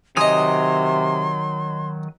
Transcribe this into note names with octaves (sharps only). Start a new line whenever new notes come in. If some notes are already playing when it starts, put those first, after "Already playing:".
C3 D#3 F#3 D#5 G#5 C6 D#6